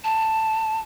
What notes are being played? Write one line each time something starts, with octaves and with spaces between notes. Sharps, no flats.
A5